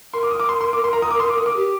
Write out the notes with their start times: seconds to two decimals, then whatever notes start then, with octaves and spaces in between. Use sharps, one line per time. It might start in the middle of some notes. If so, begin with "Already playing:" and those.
0.13 A#4 C6
0.23 D6
0.31 D#6
0.40 D6
0.49 C6
0.61 C6
0.73 D6
0.84 C6
0.93 A#5
1.02 D#6
1.11 D6
1.20 C6
1.29 D6
1.38 D#6
1.46 D6
1.56 G4